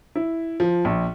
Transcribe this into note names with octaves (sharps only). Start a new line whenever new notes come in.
E4
F3
A#1